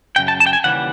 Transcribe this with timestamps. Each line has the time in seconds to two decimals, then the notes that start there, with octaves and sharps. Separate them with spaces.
0.16 F#2 C#3 G5
0.28 A5
0.40 A5
0.46 G5
0.53 G#5
0.64 D#2 C#3 E3 G3 F#5